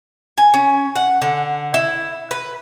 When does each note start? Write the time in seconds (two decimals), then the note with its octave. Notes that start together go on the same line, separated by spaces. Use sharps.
0.38 G#5
0.54 C#4
0.96 F#5
1.22 D3
1.74 E4
2.31 B4